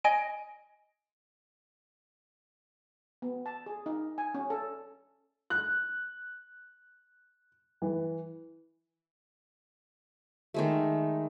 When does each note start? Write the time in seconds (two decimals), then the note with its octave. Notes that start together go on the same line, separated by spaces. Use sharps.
0.04 D#5 G#5 D7
3.22 B3
3.46 A5
3.66 G#4
3.86 D#4
4.18 G#5
4.34 C#4
4.50 A4
5.50 F#6
7.82 E3
10.54 D#3 G#3 A3